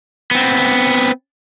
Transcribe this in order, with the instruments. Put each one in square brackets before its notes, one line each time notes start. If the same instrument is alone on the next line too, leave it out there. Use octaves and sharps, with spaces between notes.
[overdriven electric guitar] B3 C4